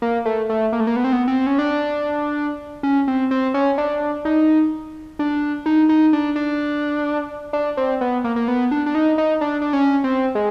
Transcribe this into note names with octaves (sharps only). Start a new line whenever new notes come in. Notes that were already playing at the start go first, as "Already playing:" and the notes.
A#3
A3
A3
A#3
A3
A#3
B3
C4
B3
C4
C#4
D4
C#4
C4
C4
C#4
D4
D#4
D4
D#4
D#4
D4
D4
D4
C4
B3
A#3
A#3
B3
D4
D4
D#4
D#4
D4
D4
C#4
C4
G#3